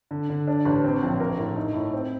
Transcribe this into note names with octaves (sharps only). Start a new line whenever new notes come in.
D3
D3
D4
A1
C4
A#1
A#4
A2
D#4
A2
C4